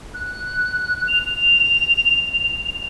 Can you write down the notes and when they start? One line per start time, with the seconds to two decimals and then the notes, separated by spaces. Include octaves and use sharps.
0.14 F#6
1.07 F7